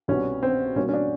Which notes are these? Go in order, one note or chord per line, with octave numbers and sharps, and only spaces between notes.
C2 B2 G3 B3 C#4
C4
B2 G3 A#3 C#4
C#4
D4